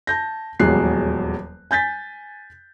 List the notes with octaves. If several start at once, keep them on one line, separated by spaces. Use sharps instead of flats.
A5 G6 A#6
D#1 E2 F#3 G#3 F#6 C7
G#5 G6 A6 B6